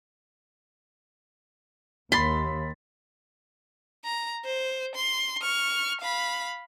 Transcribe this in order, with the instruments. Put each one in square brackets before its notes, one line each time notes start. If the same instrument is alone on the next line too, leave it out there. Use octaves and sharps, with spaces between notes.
[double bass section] D#2 [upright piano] B5 A6 B6 [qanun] C6
[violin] A#5
C5
C6
C#6 F6
F5 B5